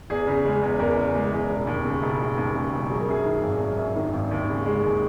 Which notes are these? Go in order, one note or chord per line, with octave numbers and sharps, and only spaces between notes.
E2 G#4
C#3
G#3
E2
E2 A#4
C#3
G#3
E2
E1
D#2
C#3
E1
E1
D#2
C#3
E1
F#3 G#4
A#4
F#2 G#4
D#3
G#1
F#3
F#2
D#3
G#1
D#2
C#3
G#3
D#2